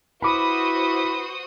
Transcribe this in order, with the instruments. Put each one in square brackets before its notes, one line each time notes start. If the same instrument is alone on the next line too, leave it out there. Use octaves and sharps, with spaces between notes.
[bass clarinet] E4 [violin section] F#4 C5 D#6 [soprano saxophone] B4 [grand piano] B5 D6